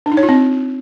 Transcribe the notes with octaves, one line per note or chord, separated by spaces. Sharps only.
D4
D#4
C#5
F4
C4